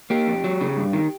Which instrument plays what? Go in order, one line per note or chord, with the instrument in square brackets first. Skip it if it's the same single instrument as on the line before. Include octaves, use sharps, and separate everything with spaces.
[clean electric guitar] A#3 G4
F2
F#3
C#3
G2
D#3